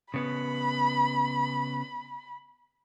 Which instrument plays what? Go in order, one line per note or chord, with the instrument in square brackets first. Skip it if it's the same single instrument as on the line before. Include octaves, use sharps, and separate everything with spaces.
[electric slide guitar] C#3 B3 [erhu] B5